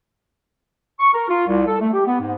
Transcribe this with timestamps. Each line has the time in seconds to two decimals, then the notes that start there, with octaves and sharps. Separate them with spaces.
1.00 C#6
1.14 A#4
1.29 F4
1.48 C2
1.67 A4
1.81 A3
1.93 G4
2.06 B3
2.20 G#2